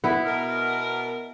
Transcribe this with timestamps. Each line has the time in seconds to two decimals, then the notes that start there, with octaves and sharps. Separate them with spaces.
0.04 B3 E4
0.25 B2 A#4